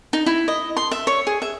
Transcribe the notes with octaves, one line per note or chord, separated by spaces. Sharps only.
D#4
E4
D#5
C6
E5
C#5
G#4
E5